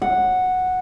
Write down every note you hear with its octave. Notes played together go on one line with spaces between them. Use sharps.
F#5